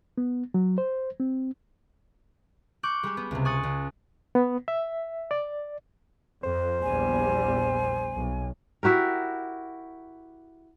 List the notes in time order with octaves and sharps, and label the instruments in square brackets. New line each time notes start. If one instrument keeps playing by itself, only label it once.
[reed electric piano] B3
F#3
C5
C4
[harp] C#6 D6 F#6 G6
G3 G#3 G4
B3
C#2 C3
G#5 C#6 D#6 F#6 A6
C#2
[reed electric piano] B3
E5
D5
[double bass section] F2 [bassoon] C5
[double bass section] A#1 E2 G3 [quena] G#5
[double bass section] B1
[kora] E4 F#4 G4 A#4